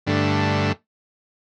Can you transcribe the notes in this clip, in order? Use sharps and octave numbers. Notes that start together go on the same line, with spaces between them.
G2 D3 A3